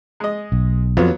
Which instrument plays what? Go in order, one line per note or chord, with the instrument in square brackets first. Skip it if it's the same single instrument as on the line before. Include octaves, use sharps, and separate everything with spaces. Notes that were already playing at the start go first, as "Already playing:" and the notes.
[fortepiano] G#3 D#5
[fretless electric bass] B1
[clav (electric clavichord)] F2 [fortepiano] F#3 B3 F4